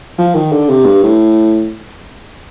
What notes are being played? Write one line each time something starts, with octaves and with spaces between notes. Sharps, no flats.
F3
D#3
D3
C3
G2
A2